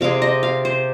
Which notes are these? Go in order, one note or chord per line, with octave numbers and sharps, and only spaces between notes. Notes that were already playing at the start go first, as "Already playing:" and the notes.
C3 G#3 F5
D#5
F5
C5